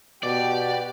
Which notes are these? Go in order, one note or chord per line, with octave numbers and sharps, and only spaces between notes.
B2 G4 D5 F#5